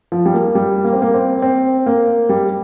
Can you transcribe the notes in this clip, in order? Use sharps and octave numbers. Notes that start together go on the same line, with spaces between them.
F3
G3
A#3
G3
A#3
C4
A#3
C4
C4
A#3
G3